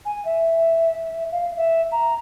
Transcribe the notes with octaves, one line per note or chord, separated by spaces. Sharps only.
G#5
E5
F5
E5
A#5